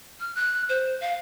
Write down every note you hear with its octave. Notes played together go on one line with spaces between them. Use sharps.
F6
F#6
C5
F5